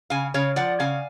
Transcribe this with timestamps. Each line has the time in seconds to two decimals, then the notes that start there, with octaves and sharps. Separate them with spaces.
0.10 C#3 F5 G#5
0.34 C#3 C#5 F5
0.56 F3 D5 F#5
0.80 C#3 F5 G#5